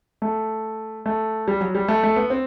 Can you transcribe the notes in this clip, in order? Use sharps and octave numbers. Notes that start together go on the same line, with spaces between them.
A3
A3
G3
F#3
G3
A3
A3
B3
C4